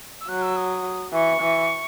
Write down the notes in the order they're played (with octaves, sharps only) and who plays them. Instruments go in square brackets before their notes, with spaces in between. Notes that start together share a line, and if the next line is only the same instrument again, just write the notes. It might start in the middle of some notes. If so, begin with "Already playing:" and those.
[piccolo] E6
[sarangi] F#3 [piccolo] F#6
[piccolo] E6
D#6
[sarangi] E3 [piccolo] C#6
[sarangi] E3